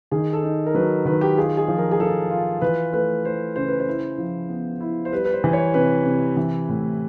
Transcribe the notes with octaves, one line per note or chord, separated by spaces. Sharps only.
D#3 G#4
A4
D#4
A#4
F#3 B4
D#3 B4
G4
F4 G#4
G#4
F3
A#4
G#4
F3 A4
F4
E3 B4
A3 B4
A3 C5
C#3 C5
B4
C5
E4
F3
B3
E4
C5
G3 B4
B4
C5
E3
C#5
C3 B4
C3
E3
A2